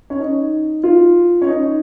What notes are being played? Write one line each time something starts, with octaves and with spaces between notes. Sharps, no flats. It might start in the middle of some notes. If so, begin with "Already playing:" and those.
C#4
D#4
F4
C#4
D#4